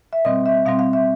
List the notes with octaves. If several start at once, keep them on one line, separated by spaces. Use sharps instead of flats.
E5
B2 G3 C4 D#5
E5
B2 G3 C4 F5
F5
E5